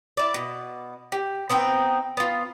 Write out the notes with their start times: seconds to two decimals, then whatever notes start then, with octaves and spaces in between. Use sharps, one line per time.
0.17 E4 D5
0.34 B2
1.12 G4
1.50 B3 C4 D#4 G5
2.17 B3 F4